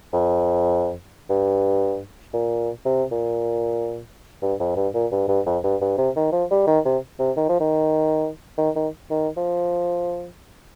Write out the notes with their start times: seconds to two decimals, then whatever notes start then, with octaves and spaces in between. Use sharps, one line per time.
0.13 F2
1.30 G2
2.33 A#2
2.85 C3
3.11 A#2
4.42 G2
4.60 F2
4.76 G2
4.94 A#2
5.12 G2
5.28 G2
5.46 F2
5.64 G2
5.81 G2
5.98 C3
6.16 D#3
6.32 F3
6.51 G3
6.67 D#3
6.85 C3
7.19 C3
7.36 D#3
7.49 F3
7.60 D#3
8.58 D#3
8.76 D#3
9.10 D#3
9.37 F3